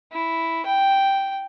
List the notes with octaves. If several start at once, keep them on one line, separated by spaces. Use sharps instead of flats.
E4
G5